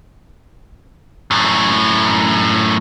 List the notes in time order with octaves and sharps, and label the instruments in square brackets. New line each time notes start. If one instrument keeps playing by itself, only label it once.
[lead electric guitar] F#2 A2